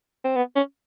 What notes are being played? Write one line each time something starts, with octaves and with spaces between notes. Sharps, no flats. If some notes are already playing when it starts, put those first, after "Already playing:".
C4
B3
C#4